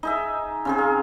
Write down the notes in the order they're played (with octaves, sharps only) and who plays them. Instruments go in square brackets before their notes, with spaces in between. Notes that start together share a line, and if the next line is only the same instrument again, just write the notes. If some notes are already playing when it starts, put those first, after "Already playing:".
[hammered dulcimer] D#4 G#4 E5
C#3 C4 G#4
F5